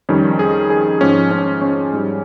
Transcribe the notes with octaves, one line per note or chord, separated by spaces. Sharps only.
F2 D#3 G3 C#4
G#4
G#4
G#2 F3 C#4
C#4
C#4
G#2 G3